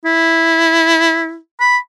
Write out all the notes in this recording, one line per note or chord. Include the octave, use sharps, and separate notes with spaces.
E4
B5